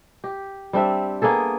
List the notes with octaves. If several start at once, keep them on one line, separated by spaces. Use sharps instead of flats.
G4
G3 C4 D4 E5
A#3 B3 G#4 A4